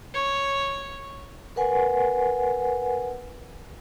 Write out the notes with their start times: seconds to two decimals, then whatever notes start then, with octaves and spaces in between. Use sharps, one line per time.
0.14 C#5
1.56 A#4 B4 F#5 G#5